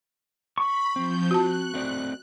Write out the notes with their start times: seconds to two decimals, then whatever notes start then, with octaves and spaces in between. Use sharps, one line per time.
0.58 B5 C#6
0.96 F3 C4 G6
1.31 F#4 A5 F#6
1.74 A3 C4 D5